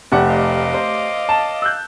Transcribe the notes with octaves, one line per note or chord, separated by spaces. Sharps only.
F1 A3 G4 D5 F#5
D#5 F5 D6
C5
A5
E6 F#6 G6